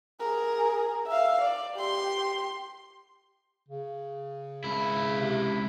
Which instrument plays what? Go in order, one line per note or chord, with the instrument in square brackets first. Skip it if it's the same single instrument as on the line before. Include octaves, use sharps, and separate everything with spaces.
[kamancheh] G#4 A#4
E5 F5
D5
G4 C6
[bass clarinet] C#3
[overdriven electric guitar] C#2 E4
[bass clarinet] C3